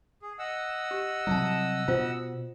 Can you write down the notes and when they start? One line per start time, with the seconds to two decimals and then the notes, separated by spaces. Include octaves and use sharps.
0.22 G#4
0.39 D#5 F#5 E6
0.91 G4
1.27 C3 F#3 G3 E4 A5
1.88 B2 F4 C5